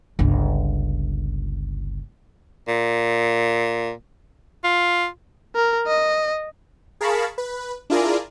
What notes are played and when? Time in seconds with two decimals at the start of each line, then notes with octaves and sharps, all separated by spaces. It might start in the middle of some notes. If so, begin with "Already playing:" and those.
0.19 G1 C#2
2.68 A#2
4.64 F4
5.56 A#4
5.87 D#5
7.01 G#4 A#4 F5 A5 B5 C#6
7.38 B4
7.90 D4 E4 F4 G#4 A#4 D5